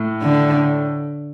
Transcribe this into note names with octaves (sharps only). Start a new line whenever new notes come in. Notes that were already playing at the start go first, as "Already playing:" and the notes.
Already playing: A2
D3